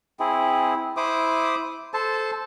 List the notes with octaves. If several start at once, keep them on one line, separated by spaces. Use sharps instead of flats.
C4 E4 G#4
E4 C5 D6 D#6
A4 C5 A5